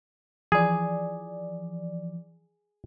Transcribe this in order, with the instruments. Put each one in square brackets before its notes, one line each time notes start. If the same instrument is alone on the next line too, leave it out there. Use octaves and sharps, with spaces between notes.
[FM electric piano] E3 F3 D5 [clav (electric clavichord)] G#4